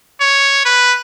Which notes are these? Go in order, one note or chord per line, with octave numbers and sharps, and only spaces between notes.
C#5
B4